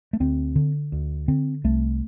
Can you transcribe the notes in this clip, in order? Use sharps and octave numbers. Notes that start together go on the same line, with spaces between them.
A3
D2 C4
D3
D2
D3 C4
C2 A3